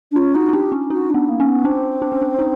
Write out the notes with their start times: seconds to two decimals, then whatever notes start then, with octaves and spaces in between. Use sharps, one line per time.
0.11 D4
0.16 C#4 F4
0.34 D#4 F#4
0.49 D#4
0.53 D4 G4
0.72 C#4
0.90 D#4 F#4
1.09 D4
1.14 B3
1.28 A#3
1.40 C#4
1.46 B3
1.64 C4 D4
2.02 D4
2.12 C#4
2.22 D4
2.39 D#4